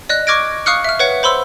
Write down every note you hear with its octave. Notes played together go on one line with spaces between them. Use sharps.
D5 D#5 F#6
C#6 D6 F6 G#6 A#6 D7
F5 C#6 D#6 F6 F#6 C#7
E5 F6
B4 C#5 F#5
C5 B5 C6 E6